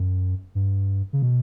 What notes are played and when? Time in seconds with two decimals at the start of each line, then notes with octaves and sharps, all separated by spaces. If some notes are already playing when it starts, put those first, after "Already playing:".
Already playing: F#2
0.55 G2
1.13 C#3
1.22 B2